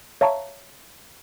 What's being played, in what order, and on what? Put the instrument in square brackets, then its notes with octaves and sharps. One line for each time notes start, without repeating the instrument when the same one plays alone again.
[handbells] C#5 E5 F5 A5 A#5 C#6